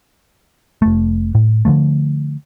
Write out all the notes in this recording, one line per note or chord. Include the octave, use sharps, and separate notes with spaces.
F1 A3
A2
D3 E3 F3 A3